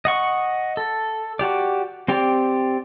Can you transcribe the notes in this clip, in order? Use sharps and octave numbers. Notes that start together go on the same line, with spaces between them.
D#5 F#5 C#6
A4
F#4 G4 D5
C4 G4 D5